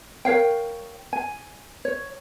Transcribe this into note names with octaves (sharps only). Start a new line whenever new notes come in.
A#4 C#5 F5 G5
G#5
C#5